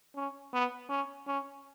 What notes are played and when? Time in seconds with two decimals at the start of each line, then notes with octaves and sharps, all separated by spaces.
0.16 C#4
0.53 B3
0.89 C#4
1.27 C#4